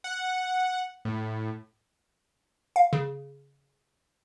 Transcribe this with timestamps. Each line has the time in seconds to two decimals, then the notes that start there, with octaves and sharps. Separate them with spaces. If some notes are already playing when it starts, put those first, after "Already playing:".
0.04 F#5
1.05 A2
2.76 F5
2.93 C#3